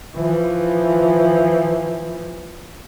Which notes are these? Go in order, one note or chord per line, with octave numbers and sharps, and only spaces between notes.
E3 F3